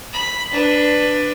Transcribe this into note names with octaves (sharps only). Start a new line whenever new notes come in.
B5
D4 B4